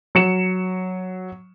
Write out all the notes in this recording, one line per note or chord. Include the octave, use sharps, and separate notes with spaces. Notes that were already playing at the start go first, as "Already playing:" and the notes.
F#3 C#7 E7